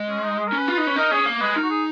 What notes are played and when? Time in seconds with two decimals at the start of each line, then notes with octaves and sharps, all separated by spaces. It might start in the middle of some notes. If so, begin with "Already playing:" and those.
Already playing: G#3
0.09 C#4
0.23 D#4
0.39 G#4
0.48 A#4
0.52 C#4
0.58 B4
0.68 F4
0.78 D#4
0.87 C#4
0.96 D#4 A#4
1.11 C#4 G#4
1.26 A#3
1.41 G#3 B4
1.55 D#4 A#4
1.63 F#4
1.70 G#4